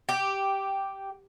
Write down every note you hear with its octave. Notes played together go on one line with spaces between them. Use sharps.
G4